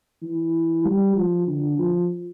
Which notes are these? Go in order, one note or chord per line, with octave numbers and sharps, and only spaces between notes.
E3
G3
F3
D3
F3